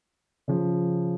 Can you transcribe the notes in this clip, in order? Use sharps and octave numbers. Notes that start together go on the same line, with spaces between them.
C#3 F3